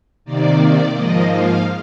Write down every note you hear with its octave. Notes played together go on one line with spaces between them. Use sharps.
C3 D#3 A#3 D5
D5
G#2 F3 A#3 D#5
F5